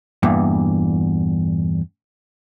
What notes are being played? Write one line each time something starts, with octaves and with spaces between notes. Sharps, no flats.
E2 G2 A#2 E3